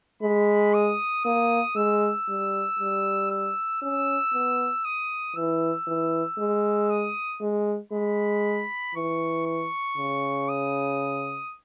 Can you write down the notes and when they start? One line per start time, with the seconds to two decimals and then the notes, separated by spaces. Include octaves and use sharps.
0.22 G#3 B5
0.74 D#6
1.25 A#3 D#6
1.76 G#3 E6
2.28 G3
2.79 G3
3.31 E6
3.82 C#4 E6
4.33 B3
4.85 D#6
5.36 E3 E6
5.87 E3
6.39 G#3
6.90 D#6
7.41 G#3
7.92 G#3 B5
8.95 E3 C#6
9.46 C#6
9.97 C#3
10.49 D#6